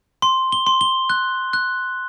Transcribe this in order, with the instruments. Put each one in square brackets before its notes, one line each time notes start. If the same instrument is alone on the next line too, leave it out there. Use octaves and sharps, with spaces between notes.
[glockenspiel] C6
G7
C6
G7
F#6
F#6